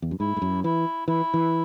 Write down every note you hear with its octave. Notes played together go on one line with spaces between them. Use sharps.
E2
F#2
G#2 E4
G#2
F#2
E3 E4
E3 E4
E3